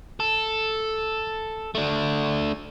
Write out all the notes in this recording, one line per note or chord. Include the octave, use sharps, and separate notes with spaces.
A4
A3 D4